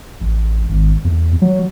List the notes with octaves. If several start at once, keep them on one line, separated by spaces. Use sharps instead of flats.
A1
G#1
E2
F#3